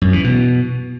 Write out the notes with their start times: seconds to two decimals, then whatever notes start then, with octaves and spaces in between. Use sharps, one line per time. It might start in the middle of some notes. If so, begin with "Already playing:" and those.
0.02 F#2
0.13 E3
0.24 B2